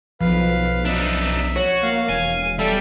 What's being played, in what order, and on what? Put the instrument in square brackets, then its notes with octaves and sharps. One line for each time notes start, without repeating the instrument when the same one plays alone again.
[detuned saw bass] B1 [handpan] F3 [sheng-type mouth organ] B4 F5
[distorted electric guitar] D4 D#4 [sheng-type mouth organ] E5
[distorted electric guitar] F#4 [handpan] C#5
[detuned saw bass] A#3 [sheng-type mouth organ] F5
[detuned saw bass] E1 [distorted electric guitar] G#5
[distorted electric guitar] G3 [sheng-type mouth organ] A4 E5